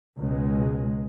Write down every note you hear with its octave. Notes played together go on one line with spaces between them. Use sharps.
C#2 B2 G#3